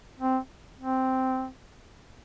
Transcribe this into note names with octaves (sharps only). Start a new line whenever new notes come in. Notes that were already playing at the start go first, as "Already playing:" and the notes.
C4
C4